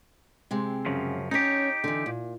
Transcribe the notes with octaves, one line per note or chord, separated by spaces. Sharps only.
C3 G#3 C4
F#2 C#3 F3
C#4 D#4 G4 C#5
D3 E3
A#2